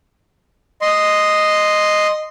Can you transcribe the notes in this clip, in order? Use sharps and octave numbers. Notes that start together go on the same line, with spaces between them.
D#5 C6